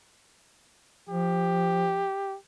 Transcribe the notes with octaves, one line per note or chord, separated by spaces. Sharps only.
F3 G4